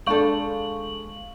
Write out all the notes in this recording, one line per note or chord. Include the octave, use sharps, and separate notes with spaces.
G#3 D4 A4 F5 C#6 F#7